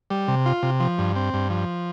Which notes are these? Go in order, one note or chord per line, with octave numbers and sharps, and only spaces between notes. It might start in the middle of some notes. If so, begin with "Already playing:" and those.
G3
C3
F4
C3
F3
G2
C4
G2
F3